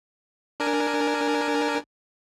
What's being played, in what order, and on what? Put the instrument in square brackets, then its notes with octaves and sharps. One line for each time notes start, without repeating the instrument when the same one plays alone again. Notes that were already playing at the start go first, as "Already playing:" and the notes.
[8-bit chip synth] D4 A#4 G#5